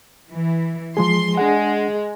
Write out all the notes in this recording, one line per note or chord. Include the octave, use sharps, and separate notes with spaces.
E3
F3 G#3 G#4 C6
G#3 D4 G#4 F#5